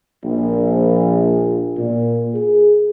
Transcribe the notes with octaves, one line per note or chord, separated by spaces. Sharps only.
A#1
A#2
G#4